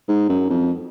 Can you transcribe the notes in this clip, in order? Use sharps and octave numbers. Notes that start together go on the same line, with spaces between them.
G#2
F#2
F2